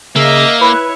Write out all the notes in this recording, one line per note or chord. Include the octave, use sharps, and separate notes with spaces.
C#3 A#3 D#5 E5
E4 B4 C#5